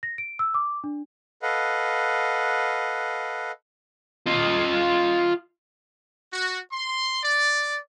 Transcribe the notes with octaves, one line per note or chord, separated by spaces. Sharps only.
A#6
D7
E6
D6
D4
A4 B4 D#5 F5 F#5
F4 D#5
F#4
C6
D5